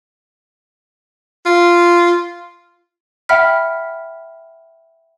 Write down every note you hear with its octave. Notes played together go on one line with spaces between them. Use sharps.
F4
E5 F#5 G5 B5 F6 B6